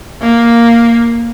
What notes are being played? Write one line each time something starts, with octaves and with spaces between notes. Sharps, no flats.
A#3